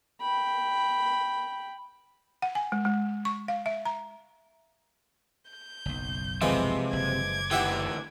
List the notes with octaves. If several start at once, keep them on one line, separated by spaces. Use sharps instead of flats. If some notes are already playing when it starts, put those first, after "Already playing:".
G5 B5
F#5
G#5
G#3
G#3
C#6
F5
E5
A#5
G6
F#1 B1
C3 E3 F3 G#3
F#1 D6 G#6
D2 E3 G4 E5 F#5